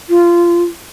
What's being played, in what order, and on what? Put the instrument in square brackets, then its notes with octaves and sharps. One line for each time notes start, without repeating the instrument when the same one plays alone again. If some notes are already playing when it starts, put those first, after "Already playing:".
[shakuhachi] F4